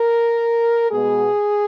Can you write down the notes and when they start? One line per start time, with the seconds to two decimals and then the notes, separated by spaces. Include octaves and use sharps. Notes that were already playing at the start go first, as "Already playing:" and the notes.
Already playing: A#4
0.91 B2 G#3 B3 G#4